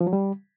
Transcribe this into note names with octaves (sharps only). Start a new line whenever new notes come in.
F3
F#3
G3